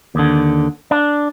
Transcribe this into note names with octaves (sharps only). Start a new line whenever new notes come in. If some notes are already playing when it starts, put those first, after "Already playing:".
D#2 D3
D4